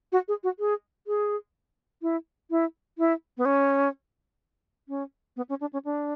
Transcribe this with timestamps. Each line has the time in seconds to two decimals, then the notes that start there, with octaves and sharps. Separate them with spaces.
0.12 F#4
0.28 G#4
0.44 F#4
0.59 G#4
1.07 G#4
2.02 E4
2.51 E4
2.98 E4
3.37 B3
3.45 C#4
4.88 C#4
5.37 B3
5.49 C#4
5.61 D4
5.73 C#4
5.85 D4